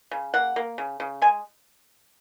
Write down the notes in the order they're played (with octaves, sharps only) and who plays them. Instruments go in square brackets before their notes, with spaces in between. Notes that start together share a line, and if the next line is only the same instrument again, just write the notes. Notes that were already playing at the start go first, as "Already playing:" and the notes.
[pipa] C#3
A#3 F#5
A#3
C#3
C#3
G#3 G#5